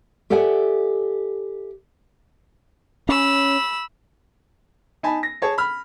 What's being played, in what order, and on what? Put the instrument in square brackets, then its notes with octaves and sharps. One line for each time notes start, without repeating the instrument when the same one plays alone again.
[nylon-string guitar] G4 A4 D5 E5 F#5 G#5
[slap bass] C#4 [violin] B5 E6
[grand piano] D#4 G#5 A5 B5
A#6
G#4 C#5 A5
B5 F6